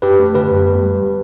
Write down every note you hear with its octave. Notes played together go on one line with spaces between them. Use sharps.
F#2 G4 B4
A3
D3 G4 B4
F#2
B3
G3